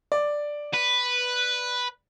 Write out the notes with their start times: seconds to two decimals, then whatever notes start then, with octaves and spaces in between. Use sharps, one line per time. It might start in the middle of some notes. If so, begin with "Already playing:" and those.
0.12 D5
0.74 B4